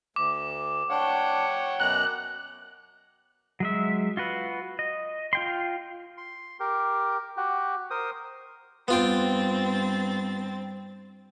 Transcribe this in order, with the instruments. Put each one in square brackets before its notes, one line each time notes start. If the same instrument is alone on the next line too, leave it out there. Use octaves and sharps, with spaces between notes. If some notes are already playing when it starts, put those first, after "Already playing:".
[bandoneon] D2 [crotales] D6
[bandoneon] D4 [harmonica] C#5 F#5 G5
[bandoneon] F#2 B2 A#5 [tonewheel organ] F#6
[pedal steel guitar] F#3 G#3 E5
F4 F#4 B4
D#5
F4 G5 C6
[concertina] C6
G4 A#4
F#4 G4
A#4 C5 D#6
[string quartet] G2 C4 A6 [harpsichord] B3 F4 G5